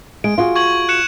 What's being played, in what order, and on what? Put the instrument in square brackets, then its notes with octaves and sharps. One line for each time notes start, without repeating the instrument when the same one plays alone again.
[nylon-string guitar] G#3 [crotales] D7
[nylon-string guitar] F4 F#4 G#4
[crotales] C#6 G#6 F#7
F#6 C#7 E7